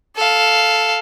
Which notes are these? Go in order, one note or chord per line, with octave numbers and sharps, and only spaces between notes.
A4 F5